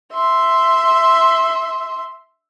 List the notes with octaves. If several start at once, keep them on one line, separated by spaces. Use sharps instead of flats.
E5 C6